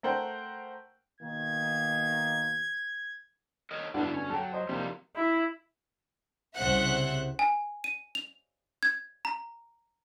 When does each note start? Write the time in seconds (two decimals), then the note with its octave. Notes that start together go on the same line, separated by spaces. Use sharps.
0.03 A3 A#4 C5 F#5 G5
1.21 B2 D#3 A#3 G#6
3.71 A#4 C#5 D#5
3.94 G2 B2 D3 D4 E4 D5
4.14 C#4
4.30 F#3 A4 G5
4.53 C5 D#5
4.69 C3 F3 G3 A#3 D#4
5.16 E4
6.55 C2 C#3 C5 E5 F#5 F#6
7.39 G#5
7.84 D#7
8.15 F7
8.83 G#6
9.25 A#5